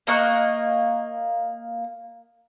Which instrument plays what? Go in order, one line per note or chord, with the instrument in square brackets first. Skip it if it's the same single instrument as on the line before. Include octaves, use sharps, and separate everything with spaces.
[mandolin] A#3 D#5 C#6 F#6